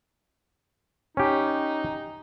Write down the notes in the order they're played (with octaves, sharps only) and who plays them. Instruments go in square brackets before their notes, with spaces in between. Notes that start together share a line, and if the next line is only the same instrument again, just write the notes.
[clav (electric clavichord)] C#4 G4 [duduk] D#4